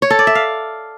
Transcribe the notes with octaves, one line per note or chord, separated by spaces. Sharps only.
C#5
A4
D5
E5
F5